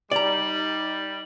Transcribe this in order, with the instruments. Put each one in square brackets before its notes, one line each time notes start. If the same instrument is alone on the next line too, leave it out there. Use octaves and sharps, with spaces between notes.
[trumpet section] G3 [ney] D#4 [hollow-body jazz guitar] D5 A#5 [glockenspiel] F#7